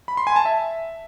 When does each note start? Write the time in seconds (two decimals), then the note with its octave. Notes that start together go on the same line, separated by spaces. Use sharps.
0.08 B5
0.17 C6
0.27 G#5
0.36 A5
0.45 E5